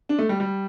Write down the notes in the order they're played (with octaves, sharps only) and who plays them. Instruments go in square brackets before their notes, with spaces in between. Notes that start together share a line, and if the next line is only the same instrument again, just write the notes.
[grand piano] D4
A3
G3
G3